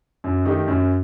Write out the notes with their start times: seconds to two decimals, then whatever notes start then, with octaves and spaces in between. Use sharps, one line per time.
0.24 F#2
0.45 D#3 A3 D#4 G4
0.68 F#2